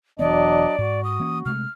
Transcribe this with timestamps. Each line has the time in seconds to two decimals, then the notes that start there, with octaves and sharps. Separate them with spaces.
0.19 E1 E3 F#3 B3 D4 D5 D#5
0.78 G#2 F#4
1.04 D#6
1.20 E3 A#3 C#4
1.46 C3 G#3 A3 F6